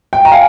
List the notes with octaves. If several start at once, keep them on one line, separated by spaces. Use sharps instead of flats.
G5
A#5
F5 G#5